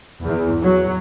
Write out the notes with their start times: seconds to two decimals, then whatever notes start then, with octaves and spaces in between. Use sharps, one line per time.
0.24 E2
0.63 F#3